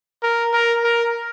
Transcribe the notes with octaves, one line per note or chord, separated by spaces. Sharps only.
A#4
A#4
A#4